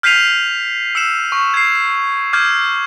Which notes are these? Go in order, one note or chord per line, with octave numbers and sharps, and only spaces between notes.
F6 G6 B6 C7 D#7 F7
E6 C#7 E7
C#6
G#6 C7
D6 F6 G6 G#6